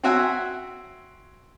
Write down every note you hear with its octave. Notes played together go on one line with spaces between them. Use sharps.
C4 C#4 F#4 E5 F#5 G#5